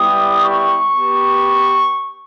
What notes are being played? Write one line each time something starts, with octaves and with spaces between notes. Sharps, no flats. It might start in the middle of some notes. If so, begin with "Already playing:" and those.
Already playing: G3 B3 E4 G4 D#6
C#6
B3 G4